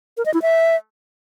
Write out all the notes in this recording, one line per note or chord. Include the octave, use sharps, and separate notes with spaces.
A#4
D#5
E4
E5